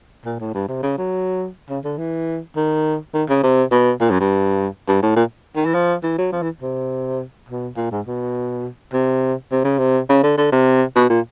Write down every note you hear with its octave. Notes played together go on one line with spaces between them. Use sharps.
A#2
A2
G2
C3
C#3
F#3
C#3
D3
E3
D#3
D#3
C#3
C3
B2
A#2
F#2
G2
G2
A2
A#2
D#3
E3
F3
E3
F#3
F3
E3
C3
B2
A#2
G#2
B2
C3
C3
C#3
C3
C#3
D3
D3
C3
B2
A#2